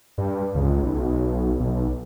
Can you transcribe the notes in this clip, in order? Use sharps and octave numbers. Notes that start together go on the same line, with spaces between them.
G2
C#2
B1
B1